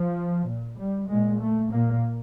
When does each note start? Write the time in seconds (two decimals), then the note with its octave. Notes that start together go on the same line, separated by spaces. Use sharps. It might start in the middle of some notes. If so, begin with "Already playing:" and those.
Already playing: F3
0.49 A#2
0.79 G3
1.10 A#2 G#3
1.41 A3
1.72 A#2 A#3